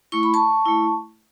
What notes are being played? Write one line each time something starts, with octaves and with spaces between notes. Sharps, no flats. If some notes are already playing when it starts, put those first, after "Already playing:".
A3 E4 C#6
B5
A5 C#6
A3 E4